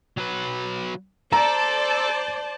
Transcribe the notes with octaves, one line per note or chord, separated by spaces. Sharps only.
F#3 B4
A4 C5 D5 A5 A#5